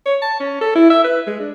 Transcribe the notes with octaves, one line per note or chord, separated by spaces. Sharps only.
C#5
A5
C#4
A4
E4
E5
B4
G#3
D4